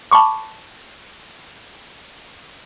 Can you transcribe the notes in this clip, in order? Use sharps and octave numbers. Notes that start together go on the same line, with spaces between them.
A5 B5 C#6 D6